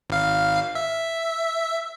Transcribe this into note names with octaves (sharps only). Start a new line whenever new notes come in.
G#1 F5
E5